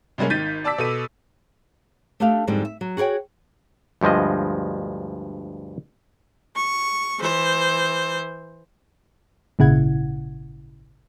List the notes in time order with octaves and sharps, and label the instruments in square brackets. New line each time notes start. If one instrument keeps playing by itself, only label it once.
[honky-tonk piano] C3 G3 G#3 A#3 C#4
G#1 D#3 G6 A6 B6 D#7
D5 A5 D6 E6 B6
B2 A4 D#7
[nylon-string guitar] A3 D4 G4 A4 E5 F5
F2 G#2 D3 G3
E5
F#3
F#4 G#4 A#4 C#5 G5
[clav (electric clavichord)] D2 G2 F3 G#3 D#5
[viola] C#6
E3 C5
[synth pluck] G#1 A#2 C#3 E4 F#5 G#6